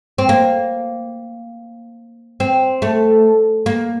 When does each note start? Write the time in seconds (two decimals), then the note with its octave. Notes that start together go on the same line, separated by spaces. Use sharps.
0.18 C4
0.29 A#3
2.40 C4
2.82 A3
3.66 A#3